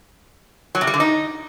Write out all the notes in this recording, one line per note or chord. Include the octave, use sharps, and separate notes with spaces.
F#3
C3
G3
D3
D#4